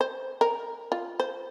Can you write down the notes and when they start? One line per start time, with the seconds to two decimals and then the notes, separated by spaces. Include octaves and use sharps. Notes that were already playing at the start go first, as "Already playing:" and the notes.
0.01 C5
0.41 A#4
0.92 F4
1.20 C5